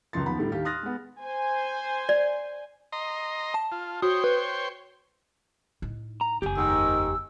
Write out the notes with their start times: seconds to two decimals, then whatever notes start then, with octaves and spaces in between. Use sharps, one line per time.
0.13 C#2 F#2 F3 C6 A6
0.26 D#2 F3 B3 B5
0.39 A2 D3 G3
0.52 D#2 D#3 G4 F5
0.65 C6 D#6 F6 F#6 A6 A#6
0.83 G#3 B3
1.22 C5 G#5
2.09 D5
2.92 D#5 A#5 C6
3.54 A5
3.72 F4
4.02 F#4 C5 C#5 G5 D#6
4.24 B4
5.82 A2 D#4
6.21 A#5
6.42 F#1 E2 G4 G#5
6.57 G#2 D#3 E6